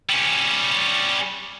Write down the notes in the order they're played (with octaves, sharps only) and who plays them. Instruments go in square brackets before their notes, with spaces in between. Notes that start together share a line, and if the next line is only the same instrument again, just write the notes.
[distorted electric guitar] G3 C#4